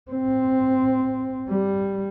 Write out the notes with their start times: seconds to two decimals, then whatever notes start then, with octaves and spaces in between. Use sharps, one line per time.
0.12 C4
1.49 G3